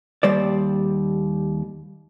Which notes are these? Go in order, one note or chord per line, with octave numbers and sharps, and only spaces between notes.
D#2 G3 C5 D5